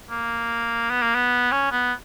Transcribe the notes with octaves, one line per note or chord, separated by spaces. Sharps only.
A#3
B3
A#3
B3
C#4
B3